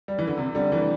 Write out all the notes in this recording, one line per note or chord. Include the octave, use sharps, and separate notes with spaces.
G3
E3
D3
C3
D3 G3
E3 A3